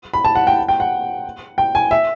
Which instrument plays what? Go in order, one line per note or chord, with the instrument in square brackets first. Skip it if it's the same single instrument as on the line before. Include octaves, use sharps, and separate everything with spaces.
[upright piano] B5
A5
F#5
G5
G5
F#5
G5
G#5
E5